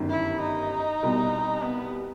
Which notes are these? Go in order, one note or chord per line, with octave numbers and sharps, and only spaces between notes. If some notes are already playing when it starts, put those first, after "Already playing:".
Already playing: G1 F#2 D#3 G3
E4
D#4
C2 B2 G3
B3